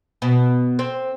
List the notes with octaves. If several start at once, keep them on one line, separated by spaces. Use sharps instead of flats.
B2
C4